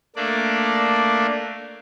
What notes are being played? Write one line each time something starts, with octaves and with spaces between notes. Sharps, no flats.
A3 A#3 D4 D5